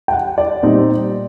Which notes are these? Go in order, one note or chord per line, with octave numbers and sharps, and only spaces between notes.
G5
F#5
D5
A#2 G3 C4 D#4